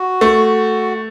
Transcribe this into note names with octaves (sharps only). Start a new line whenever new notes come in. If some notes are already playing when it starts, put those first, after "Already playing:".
Already playing: F#4
A3